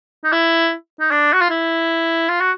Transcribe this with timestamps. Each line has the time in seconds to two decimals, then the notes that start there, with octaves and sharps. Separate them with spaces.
0.24 D#4
0.32 E4
1.00 D#4
1.11 D4
1.33 F#4
1.41 F4
1.50 E4
2.29 F4
2.41 F#4